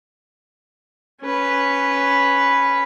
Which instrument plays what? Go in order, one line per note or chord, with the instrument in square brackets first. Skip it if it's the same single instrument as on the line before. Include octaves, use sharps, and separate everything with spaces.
[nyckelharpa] C#4 B4